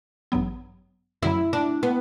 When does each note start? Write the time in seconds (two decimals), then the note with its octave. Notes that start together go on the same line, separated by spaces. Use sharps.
0.32 A1 G2 F#3 B3
1.23 F#2 D3 F#3 E4
1.53 D4
1.83 B3